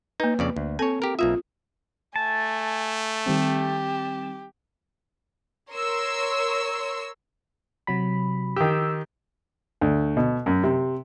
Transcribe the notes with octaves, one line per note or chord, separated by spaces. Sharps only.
A#3 D#4 B4
F2 C#3 D5
D2
C4 A4 C#5 G#5
G4 A#4
B1 A#3 F4 E5
A3 G#5 A5
D#3 G3 C4 G4
A#4 C#5 C6 E6
C3 F#3 B5
D#3 G4 E6
D2
B2
F#2
C3